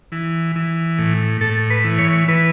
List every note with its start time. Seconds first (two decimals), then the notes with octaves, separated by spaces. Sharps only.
0.12 E3
0.56 E3
0.99 A2
1.41 A2 A4
1.70 B4
1.84 E3
1.99 C#5
2.28 E3 B4